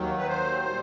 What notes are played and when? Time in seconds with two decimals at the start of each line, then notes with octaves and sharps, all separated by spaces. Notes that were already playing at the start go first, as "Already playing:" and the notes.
Already playing: D#2 D#3 F#3
0.18 B4
0.28 C5
0.64 A#2 G3